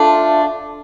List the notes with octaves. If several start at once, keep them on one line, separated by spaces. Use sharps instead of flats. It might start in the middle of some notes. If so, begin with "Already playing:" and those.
Already playing: A3 D4 F4